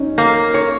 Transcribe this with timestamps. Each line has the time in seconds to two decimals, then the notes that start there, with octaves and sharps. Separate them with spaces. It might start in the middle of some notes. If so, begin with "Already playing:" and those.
Already playing: C#4 D#4
0.18 A#3
0.54 C#5